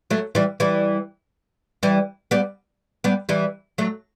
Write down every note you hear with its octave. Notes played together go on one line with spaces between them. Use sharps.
F#3 A3
E3 G3
E3 G3
E3 G3
G3 B3
G3 B3
E3 G3
F#3 A3